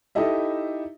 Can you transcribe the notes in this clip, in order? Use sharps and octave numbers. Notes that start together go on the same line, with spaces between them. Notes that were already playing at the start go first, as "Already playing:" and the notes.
D#4 E4 G4 A4 D#5 E5